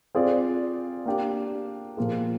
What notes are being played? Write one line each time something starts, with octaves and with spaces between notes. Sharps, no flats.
C4 F4 G#4 D5
A#3 D4 G4
A#2 F3 A#3 F4 G#4